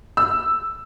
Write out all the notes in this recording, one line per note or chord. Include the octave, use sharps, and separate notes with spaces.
E6